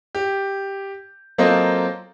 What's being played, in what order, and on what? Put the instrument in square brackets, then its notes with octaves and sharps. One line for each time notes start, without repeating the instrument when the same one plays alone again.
[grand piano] G4
F#3 A#3 C4 F4 A4 D#5